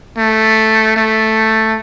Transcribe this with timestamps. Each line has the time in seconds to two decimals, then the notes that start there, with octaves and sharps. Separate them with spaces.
0.18 A3
0.97 A3